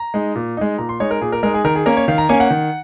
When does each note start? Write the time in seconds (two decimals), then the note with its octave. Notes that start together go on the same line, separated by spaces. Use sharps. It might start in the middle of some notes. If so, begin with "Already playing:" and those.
Already playing: A#5
0.14 G#3 D#4
0.35 A#2
0.57 G#3 D#4
0.78 A#2 A#5
0.89 C6
1.00 G#3 D#4 C#5
1.11 A#4
1.21 A#2 G#4
1.32 A#4
1.43 G#3 A#4
1.46 D#4
1.54 G#4
1.64 D#3 A#4
1.76 G#4
1.86 A#3 C#4 A#4
1.97 C#5
2.08 D#3 F5
2.18 A#5
2.29 A#3 C#4 G#5
2.40 F#5
2.50 D#3